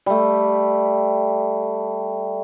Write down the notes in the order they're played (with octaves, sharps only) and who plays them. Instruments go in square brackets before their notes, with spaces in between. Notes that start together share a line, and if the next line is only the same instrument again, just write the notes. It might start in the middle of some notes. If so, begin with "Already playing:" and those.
[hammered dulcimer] G3 A3